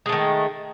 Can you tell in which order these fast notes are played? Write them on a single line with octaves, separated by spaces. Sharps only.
G#3 A3 D#3